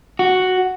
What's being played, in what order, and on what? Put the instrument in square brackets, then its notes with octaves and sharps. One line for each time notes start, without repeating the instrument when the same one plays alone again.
[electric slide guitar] F#4